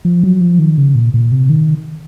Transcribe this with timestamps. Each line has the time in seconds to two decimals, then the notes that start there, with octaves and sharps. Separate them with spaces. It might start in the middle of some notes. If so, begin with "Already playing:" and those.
0.05 F3
0.23 F#3
0.41 F3
0.59 D#3
0.78 C#3
0.95 A#2
1.14 A#2
1.32 C3
1.49 D#3